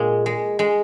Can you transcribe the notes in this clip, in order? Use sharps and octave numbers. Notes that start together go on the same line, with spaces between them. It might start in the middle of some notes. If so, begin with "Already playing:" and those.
Already playing: A#2 G#3
G#3
G#3